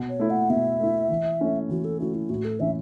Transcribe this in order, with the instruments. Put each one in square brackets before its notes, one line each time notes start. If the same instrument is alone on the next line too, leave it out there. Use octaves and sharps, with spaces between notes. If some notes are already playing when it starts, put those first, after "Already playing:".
Already playing: [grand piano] B2
[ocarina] C#5
[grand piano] A3 E4
[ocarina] F#5
[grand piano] B2 [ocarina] E5
[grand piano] A3 E4
E3
A3 C#4 E4
[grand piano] E3 [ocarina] F#4
[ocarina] A4
[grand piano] A3 C#4 E4 [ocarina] F#4
[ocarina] E4
[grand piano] A2 [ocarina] F#4
[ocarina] A4
[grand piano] E3 C#4 E4 [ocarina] E5